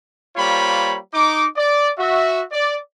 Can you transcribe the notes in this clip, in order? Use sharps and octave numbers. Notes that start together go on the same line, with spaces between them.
G3 A#3 F4 C5 C#5 B5
D#4 D6
D5
F#4 E5
D5